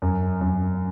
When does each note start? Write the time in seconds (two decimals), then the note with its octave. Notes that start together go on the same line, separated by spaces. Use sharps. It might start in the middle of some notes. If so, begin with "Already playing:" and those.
0.02 F#2
0.41 F#2